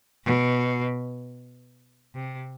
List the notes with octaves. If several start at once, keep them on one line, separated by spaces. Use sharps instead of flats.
B2
C3